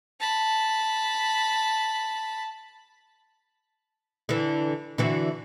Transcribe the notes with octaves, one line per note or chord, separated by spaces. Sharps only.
A5 B5
D3 E3
D3 E3 F#4